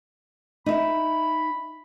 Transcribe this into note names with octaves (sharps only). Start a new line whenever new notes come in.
D#4 E5 B5